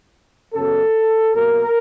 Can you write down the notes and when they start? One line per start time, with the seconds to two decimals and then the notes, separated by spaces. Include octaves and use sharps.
0.54 F#2 C#3 F#3 B3 A4
1.35 B2 F#3 A#3 A#4